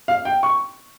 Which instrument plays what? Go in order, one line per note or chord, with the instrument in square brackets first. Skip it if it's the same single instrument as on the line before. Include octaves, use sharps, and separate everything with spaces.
[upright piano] F5
G5
C#6